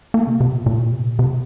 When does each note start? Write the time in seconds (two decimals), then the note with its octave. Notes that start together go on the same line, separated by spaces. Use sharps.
0.14 A#3
0.27 C3
0.40 C3
0.54 A#2
0.66 A#2
0.92 C3
1.19 C3